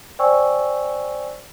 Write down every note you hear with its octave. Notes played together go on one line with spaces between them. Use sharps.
C5 D5 G5 G#5 C#6 E6